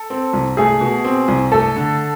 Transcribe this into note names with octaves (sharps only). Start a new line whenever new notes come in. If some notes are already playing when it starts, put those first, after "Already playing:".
Already playing: A4
C4
C2
A3 G#4
B2
C4
C2
A3 A4
D3